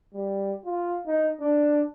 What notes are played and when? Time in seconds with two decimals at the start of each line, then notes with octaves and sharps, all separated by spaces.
0.14 G3
0.65 F4
1.07 D#4
1.40 D4